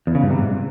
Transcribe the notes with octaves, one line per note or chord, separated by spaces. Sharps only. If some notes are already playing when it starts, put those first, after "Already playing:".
E2
C#3
G2
C3
G#2